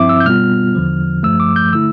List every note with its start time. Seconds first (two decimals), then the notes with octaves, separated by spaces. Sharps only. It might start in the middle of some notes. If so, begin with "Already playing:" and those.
Already playing: G2 F3 C4 E4 E5 D6
0.09 E6
0.20 G6
0.25 B2 G3 B3 F4 F6
0.75 E2 D3 F3
1.23 G2 F3 A3 E6
1.40 D6
1.56 G6
1.73 D3 A3 E4 E6